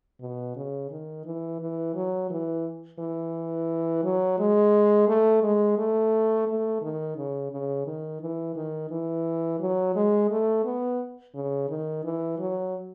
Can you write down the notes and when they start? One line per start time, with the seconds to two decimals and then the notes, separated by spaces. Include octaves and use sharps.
0.21 B2
0.56 C#3
0.91 D#3
1.25 E3
1.60 E3
1.95 F#3
2.30 E3
2.99 E3
4.04 F#3
4.39 G#3
5.08 A3
5.43 G#3
5.78 A3
6.47 A3
6.82 D#3
7.17 C#3
7.51 C#3
7.86 D#3
8.21 E3
8.56 D#3
8.91 E3
9.60 F#3
9.95 G#3
10.30 A3
10.65 B3
11.34 C#3
11.69 D#3
12.04 E3
12.39 F#3